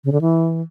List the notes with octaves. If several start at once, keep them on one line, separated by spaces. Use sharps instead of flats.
C#3
D3
E3